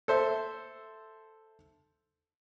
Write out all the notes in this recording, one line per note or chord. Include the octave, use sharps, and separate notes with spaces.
A4 C5 E5